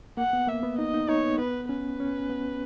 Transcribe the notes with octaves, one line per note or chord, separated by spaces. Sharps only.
A#3 F#5
B3
A#3 E5
B3
D#4 D#5
D#4
D#4 C#5
B3
B3 B4
C#4 B4
C#4
B3